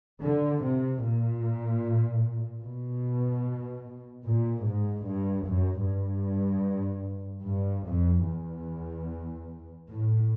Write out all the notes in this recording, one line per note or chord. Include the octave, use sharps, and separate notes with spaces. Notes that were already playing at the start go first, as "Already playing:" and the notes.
D3
C3
A#2
B2
A#2
G#2
G2
F#2
G2
G2
F2
E2
A2